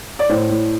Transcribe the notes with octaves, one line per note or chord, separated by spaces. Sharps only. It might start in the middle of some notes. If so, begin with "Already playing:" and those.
D5
A2 C5
A2